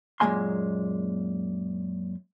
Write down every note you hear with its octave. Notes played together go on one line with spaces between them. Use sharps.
F#2 A#2 G#3 A#3 G#5 C6